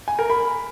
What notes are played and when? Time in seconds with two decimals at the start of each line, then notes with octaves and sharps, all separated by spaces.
0.08 G#5
0.19 A#4
0.30 B5